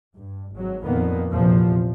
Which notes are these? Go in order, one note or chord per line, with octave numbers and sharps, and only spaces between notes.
G2
G#1 F#3
F2 A#2 D#3 A#3 B3
A#1 E2 C3 F3